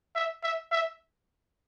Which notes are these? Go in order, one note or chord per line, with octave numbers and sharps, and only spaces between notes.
E5
E5
E5